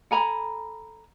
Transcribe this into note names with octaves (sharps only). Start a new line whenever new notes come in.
A4 G#5 A#5 B5